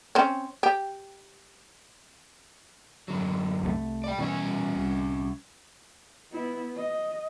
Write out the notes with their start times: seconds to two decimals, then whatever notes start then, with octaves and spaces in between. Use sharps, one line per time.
0.15 C4 C#4
0.63 G4
3.08 F#2 D3 F#3
3.63 C2 E3 A3
4.04 D5 G5
4.18 B2 E3 G3 C#4 G#5
4.75 C2
6.32 B3 E4
6.76 D#5